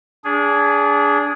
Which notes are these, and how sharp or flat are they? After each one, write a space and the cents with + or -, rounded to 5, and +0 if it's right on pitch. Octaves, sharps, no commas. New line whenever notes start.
D4 -25 G#4 +0